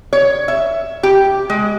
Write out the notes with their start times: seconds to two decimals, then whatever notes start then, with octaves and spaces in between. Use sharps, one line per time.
0.13 C#5
0.48 E5
1.03 G4
1.50 G#3